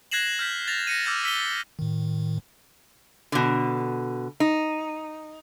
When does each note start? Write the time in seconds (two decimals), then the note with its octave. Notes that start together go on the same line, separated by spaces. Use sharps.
0.11 F#6 G#6 A#6 C7 E7 F#7
0.39 F6 G6 B6
0.67 A6 A#6 F7
0.87 A#6 C#7 D#7
1.06 D6 E6 F6 G6 A6
1.24 E6 B6 D#7 G7
1.79 A2 D#3
3.32 B2 D3
4.40 D#4